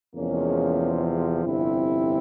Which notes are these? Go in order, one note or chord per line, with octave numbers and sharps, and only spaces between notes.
E2 C3 F3 G#3 A#3 C#4
G1 F2 C3 C4 E4